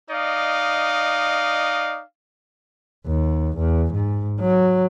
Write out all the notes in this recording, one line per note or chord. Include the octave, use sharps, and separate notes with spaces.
D#4 D5 D#5 F5
D#2
E2
G#2
F#3